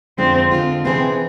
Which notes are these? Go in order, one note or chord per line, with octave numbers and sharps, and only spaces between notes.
F2 D3 G#3 C4 D4 F4
F2 D3 G#3 D4 F4
C3 E3 B3 C4 D4 G#4